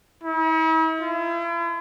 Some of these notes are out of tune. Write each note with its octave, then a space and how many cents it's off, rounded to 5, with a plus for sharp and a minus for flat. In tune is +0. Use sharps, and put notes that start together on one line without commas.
E4 -45
E4 +45